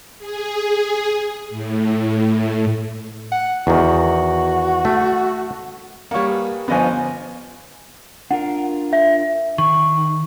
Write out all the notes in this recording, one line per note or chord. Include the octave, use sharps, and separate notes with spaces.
G#4
A2
F#5
E2 D#3 F#4
A3
G3 A#3 C#5 F#5
G#4 B4
G1 F3 B3 C5 D#5 G#5
D4 F4 A#4 F#5
E5
D#3 C#6